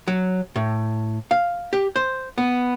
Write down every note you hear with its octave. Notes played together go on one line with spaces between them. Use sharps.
F#3
A2
F5
G4
C5
B3